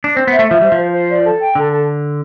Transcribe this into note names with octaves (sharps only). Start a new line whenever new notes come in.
D4
C4 C5
B3
E5
A3
F3 E5
G3 C5
F3
C5
C5
D5
A4
G5
D3 A4
A4